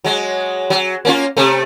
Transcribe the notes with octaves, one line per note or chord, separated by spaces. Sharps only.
F#3 G#3
F#3
A#3 C#4 F4
C3 A3